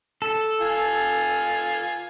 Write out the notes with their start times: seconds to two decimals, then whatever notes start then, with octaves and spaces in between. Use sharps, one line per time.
0.22 A4
0.61 F4 G#5